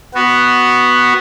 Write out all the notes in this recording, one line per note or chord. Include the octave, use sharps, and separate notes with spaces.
B3 F#4